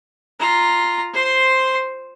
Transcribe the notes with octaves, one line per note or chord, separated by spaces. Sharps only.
F4 A#5
C5 C6